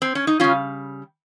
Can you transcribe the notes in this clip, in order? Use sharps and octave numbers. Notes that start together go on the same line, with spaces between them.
C4
C#4
D#4
C#3 G3 C#4 F4